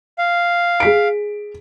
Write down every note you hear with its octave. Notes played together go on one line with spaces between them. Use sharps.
F5
G#4 B6 D7